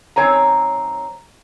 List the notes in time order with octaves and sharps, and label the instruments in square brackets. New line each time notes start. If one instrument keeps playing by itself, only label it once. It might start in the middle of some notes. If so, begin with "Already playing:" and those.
[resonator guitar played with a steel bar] F#2 D#3 C4 C#5 G#5 A#5